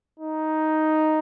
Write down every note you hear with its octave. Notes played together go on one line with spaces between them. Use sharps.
D#4